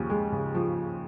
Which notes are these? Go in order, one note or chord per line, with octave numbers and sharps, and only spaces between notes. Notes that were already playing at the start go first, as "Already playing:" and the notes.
Already playing: D#2 C#3 F3
G#3
C#3
F3